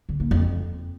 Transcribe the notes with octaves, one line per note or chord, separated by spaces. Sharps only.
D3
A#3
F2